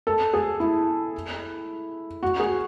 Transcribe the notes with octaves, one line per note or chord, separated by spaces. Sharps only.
A4
G#4
E4
F#4
G#4